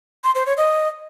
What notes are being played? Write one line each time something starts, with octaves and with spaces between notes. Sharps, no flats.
C6
C5
C#5
D#5